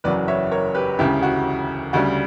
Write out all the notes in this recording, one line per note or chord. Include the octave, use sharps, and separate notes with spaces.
F#1 E2 C#3 F#3 B4 D5
C#5 E5
A#4 C#5
G4 B4
E1 D2 C#3 E4 G4
F#4
D2 C#3 G3 F#4